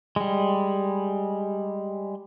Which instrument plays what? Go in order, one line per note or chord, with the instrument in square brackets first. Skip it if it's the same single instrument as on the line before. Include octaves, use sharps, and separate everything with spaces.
[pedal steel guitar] G3 G#3